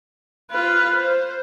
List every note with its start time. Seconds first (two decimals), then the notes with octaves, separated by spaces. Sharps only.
0.51 F4 B4
0.98 C5